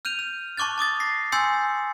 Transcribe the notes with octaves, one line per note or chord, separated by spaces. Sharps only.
F6 G6 D#7 F7
F6
A5 C#6 D6 F#6 A6
A5 D6 D#6 A6
A#6 C7
G#5 C6 E6 G6 A6 C#7